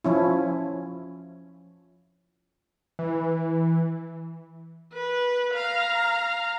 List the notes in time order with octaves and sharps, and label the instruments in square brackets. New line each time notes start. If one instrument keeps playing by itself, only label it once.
[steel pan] F3 C#4 E4
[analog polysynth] E3
[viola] B4
F5 A#5